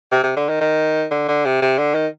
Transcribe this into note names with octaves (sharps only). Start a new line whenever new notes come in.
C3
C3
D3
D#3
D#3
D3
D3
C3
C3
D3
D#3